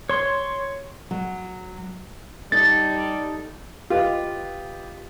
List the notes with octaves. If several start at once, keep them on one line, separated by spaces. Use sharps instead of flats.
C#5 C6
F#3
G3 D#4 A4 A6
F4 G4 B4 D#5